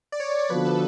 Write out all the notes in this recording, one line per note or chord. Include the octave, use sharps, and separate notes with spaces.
D5
C#5
D3 F3 B3 F#4 B4
A4